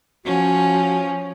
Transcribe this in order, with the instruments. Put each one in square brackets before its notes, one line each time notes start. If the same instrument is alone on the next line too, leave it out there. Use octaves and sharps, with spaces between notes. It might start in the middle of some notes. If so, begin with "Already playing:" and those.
[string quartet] F3 C#4 [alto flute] F#4